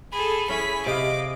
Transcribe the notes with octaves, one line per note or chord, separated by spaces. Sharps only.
G#4 A4 B5
C#4 E4 G#4 C#5 B6
C3 D#5 F5 D6